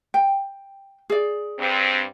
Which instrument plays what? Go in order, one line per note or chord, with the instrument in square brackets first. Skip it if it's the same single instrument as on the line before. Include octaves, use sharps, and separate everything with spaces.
[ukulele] G5
G#4 D5
[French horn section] G2 C4